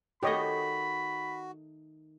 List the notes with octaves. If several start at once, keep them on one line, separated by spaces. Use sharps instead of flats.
D#3 A3 F#4 G4 C#5 D#5 B5